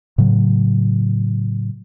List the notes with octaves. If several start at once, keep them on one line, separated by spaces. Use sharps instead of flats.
A2 C#3 F#3